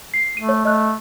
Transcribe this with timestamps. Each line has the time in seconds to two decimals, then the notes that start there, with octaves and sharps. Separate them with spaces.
0.14 C7
0.37 A3 D#7
0.49 C#5
0.65 A3 D#5 F6 F#6